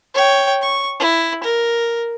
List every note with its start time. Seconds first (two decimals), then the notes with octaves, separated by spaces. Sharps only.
0.14 C#5 G5
0.62 C#6
1.00 E4
1.43 A#4